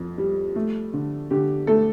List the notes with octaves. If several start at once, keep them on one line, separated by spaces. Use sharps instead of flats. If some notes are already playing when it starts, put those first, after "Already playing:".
Already playing: F2
G3
A3
D3
D3 G4
A3 A4